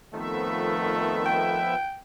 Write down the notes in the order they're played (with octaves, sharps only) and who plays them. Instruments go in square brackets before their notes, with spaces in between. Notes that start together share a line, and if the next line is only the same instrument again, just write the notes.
[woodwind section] F2 D#3 [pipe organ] F3 B3 E5 [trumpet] A3
[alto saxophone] G5